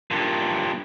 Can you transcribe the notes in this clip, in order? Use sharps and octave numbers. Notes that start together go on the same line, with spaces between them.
G2 A#2